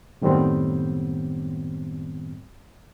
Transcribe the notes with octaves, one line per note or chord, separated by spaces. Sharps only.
F#2 A2 D#3 G3 B3 C4